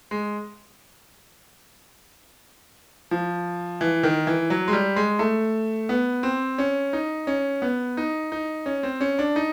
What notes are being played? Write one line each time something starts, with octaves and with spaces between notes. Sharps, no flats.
G#3
F3
E3
D#3
E3
F#3
G#3
G3
G#3
A3
B3
C4
C#4
D#4
C#4
B3
D#4
D#4
C#4
C4
C#4
D4
D#4